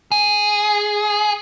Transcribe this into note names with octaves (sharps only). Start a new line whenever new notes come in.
G#4